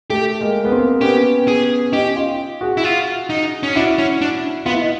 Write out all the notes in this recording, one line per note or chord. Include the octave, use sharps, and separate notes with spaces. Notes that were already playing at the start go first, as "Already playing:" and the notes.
A3 G4
G#3 A#3
B3
A#3 C4
B3 C#4 G4
G#4
C#4 D#4 G4
D#4 F4
F#4 G#4
E4
F4
D#4
C#4
D4 E4 F#4
C#4
D4
B3 F4
E4
D#4